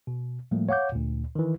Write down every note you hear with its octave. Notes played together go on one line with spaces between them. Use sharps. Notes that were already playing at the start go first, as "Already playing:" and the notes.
B2
A2 F3 G3 A3 A#3
C#5 F5 F#5 D6 G6
D2 A#2
D#3 E3